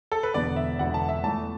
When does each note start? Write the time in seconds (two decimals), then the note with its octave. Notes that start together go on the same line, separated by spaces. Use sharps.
0.12 A4
0.23 B4
0.34 E1 E2 D3 B3 D5
0.56 E5
0.79 E1 E2 D3 B3 F#5
0.94 A5
1.09 E5
1.23 E2 E3 A3 A5